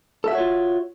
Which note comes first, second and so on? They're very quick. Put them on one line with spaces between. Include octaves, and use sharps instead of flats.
A4 E5 F#4 C#5 F4